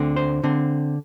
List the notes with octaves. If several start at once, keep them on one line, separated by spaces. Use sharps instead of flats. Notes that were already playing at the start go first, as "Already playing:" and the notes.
Already playing: D2 D3 C4
C5
D3 C4